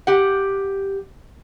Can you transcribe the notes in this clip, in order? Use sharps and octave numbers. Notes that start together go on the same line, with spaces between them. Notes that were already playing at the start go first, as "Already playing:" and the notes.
G4 F#5